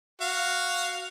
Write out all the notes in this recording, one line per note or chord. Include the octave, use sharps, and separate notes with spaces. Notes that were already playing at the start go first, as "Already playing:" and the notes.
F#4 F5